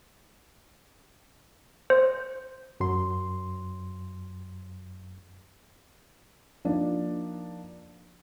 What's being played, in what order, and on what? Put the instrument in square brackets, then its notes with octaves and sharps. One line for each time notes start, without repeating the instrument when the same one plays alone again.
[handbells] C5
[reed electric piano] F#2 F#3 C6
[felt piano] F3 A#3 D4 D#4